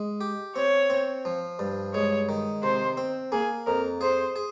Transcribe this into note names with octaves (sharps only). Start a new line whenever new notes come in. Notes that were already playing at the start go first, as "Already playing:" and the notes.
Already playing: G#3
G4
C4 C#5
C4
F3
G2
G#3 C#5
D#3
C3 C5
C4
A#3 G#4
F2 A#4
G#4 C5
G#4